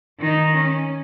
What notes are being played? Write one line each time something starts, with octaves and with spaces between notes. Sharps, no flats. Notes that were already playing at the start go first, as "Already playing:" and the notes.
D#3 D#4
C#4